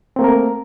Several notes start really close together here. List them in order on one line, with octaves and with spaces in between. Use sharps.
C4 A#3 A3 A#4